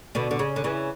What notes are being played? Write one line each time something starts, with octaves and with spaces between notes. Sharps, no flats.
B2 D3
D3
C#3
D3
C#3 E3